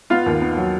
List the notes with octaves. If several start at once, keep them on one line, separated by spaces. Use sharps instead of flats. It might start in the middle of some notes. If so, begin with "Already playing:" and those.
B3 F4 F5
D#2
B3
F#3